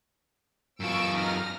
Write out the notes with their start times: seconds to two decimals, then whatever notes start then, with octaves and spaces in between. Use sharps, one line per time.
0.80 F#2 F4 C#6 E6 D7
1.15 D#4 F6 A#6